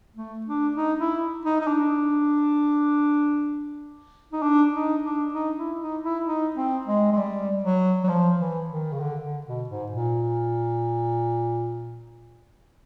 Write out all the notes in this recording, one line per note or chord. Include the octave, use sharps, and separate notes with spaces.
A3
D4
D#4
E4
D#4
D#4
D4
D#4
D4
D#4
D4
D#4
E4
D#4
E4
D#4
C4
G#3
G#3
G3
F#3
F#3
F3
E3
D#3
C#3
D3
D3
B2
G#2
A#2